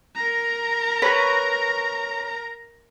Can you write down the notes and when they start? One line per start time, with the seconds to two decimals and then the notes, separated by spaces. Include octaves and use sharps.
0.15 A#4 A#5
1.02 B4 C#5